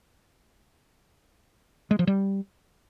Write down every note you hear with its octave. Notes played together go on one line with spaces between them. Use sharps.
G#3
F3
G3